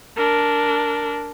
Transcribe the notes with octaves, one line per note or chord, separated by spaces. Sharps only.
D4 A#4